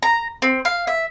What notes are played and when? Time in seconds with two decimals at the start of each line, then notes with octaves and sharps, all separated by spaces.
0.02 A#5
0.42 C4
0.65 F5
0.87 E5